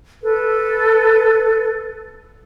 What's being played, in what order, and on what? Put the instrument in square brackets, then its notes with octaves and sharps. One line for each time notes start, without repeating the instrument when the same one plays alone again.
[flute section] A4 B4